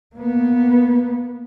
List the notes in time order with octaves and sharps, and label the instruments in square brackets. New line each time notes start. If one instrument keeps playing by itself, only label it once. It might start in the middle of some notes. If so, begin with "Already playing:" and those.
[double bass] A#3 B3